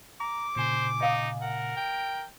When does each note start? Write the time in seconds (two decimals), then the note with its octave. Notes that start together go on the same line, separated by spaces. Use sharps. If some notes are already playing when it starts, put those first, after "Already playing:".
0.20 A#5 D6
0.56 A#2 C#3 C5 G#5
1.01 D#4 D#5 F5 D#6
1.42 A#4 F#5
1.77 G5